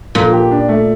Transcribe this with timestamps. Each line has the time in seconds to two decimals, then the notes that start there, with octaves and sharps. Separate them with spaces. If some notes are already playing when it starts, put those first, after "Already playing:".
0.15 A#2 F3
0.33 G4
0.51 D4
0.69 A3